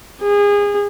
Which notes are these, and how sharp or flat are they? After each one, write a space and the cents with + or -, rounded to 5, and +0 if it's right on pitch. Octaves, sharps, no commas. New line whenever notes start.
G#4 -30